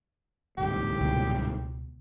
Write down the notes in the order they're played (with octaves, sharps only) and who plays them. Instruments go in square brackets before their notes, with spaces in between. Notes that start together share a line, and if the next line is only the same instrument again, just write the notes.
[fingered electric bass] D1 C2 G#2 [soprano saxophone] G4
[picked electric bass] C#2 B2